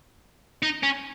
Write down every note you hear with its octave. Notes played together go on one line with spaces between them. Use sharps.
D#4
C#4